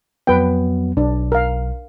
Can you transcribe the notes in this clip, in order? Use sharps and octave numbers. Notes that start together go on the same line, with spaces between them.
F2 F#3 B3 B4 G5
B1 D4
A#4 F5